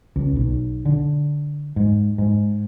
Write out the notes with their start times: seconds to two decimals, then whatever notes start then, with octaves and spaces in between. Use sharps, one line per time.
0.16 C#2
0.36 B1
0.85 D3
1.76 G#2
2.18 G#2